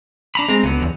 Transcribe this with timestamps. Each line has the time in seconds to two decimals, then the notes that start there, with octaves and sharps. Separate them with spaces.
0.35 D4 A#5 B5
0.49 G#3 C4 A#5
0.63 C#2 D3 F#3 B3
0.82 E2